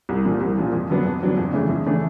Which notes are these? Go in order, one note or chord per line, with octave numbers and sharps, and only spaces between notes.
C2
A#2 F3
C2
A#2 F3
F2
D3 F#3 B3 D4
F2
D3 F#3 B3 D4
F2
C#3 E3 A3 D4
F2
C#3 E3 A3 D4